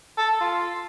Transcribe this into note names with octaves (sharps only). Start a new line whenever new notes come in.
A4
F4